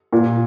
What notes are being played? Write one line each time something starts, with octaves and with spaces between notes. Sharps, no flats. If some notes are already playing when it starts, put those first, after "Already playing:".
A#2